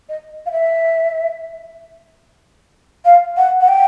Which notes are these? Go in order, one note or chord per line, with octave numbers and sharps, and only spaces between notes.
D#5
F5
E5
F5
F#5
F#5
G5